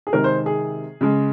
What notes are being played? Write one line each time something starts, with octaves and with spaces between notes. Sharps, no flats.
G#4
C3 D#3 G#3 A#4
C5
G#4
C#3 G#3